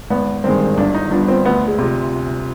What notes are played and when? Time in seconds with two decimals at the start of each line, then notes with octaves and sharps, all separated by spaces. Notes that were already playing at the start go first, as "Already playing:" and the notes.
0.10 G#1 B3
0.44 G2 D#3 G#3 C4
0.78 G1 D4
0.95 D#4
1.11 G2 F3 B3 D4
1.28 C4
1.45 D2 B3
1.68 G#3
1.79 C3 F3